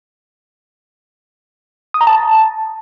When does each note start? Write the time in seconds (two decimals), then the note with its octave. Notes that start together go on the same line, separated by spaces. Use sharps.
1.94 D#6
2.01 A#5
2.07 A5